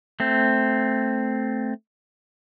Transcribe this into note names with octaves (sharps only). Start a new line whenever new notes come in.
A3 C4